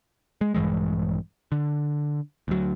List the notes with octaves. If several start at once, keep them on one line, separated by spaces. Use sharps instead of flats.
G#3
A#1 G2 E3 G#3
D3
D2 F#3